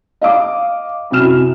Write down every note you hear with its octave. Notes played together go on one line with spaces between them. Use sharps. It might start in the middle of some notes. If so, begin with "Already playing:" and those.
D#5 F5 D6
F#2 C3 E4 F#4 F6 E7